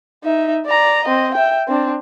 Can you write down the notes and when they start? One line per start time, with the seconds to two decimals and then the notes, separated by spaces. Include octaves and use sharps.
0.24 D#4 E5
0.66 D5 A#5
1.05 C4 D#5
1.35 E5 G5
1.68 C4 D4